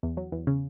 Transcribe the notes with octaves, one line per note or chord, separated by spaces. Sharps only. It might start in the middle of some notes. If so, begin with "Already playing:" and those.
E2
F#3
E2
C#3